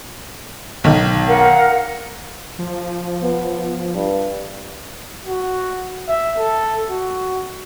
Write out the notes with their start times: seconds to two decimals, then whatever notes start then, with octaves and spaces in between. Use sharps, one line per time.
0.84 B1 D#3
1.28 A#4 F5 F#5
2.59 F3
3.23 B3
3.95 G2
5.25 F#4
6.09 E5
6.38 A4
6.89 F#4